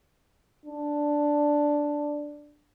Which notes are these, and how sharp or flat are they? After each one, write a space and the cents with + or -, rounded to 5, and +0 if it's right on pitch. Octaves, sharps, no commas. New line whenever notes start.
D4 +0